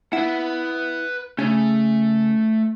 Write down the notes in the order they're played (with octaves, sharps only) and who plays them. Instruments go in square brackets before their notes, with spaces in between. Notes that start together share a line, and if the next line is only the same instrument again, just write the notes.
[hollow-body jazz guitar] E4 [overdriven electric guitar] B4 F#5
[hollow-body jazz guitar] C#3 C#4 G#4 [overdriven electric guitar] A3